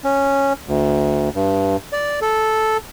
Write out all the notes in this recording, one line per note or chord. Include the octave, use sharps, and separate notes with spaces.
C#4
D2
G2
D5
A4